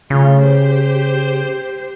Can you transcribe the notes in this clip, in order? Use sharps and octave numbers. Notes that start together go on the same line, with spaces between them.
C#3 A3 F4
G4 C5